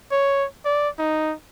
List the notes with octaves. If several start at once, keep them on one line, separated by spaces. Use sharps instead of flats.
C#5
D5
D#4